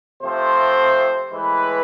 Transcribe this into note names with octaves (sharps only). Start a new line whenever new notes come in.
C3 F3 A3 C4 C5
A2 E3 G#3 B4